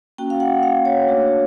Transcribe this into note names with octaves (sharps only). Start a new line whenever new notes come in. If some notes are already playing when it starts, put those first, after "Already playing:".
A#3 C#4 F#4 G5
F5
F#5
F5
C#5
A3 D4 F#4